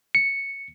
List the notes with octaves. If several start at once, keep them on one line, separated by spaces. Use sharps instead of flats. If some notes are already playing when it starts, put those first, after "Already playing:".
C#7